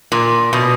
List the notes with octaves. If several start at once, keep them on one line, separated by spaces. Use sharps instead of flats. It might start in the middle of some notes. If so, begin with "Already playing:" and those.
A#2
B2